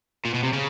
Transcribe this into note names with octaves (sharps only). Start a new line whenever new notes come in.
A#2
B2
C3
C#3